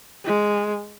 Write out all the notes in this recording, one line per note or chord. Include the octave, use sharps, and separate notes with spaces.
G#3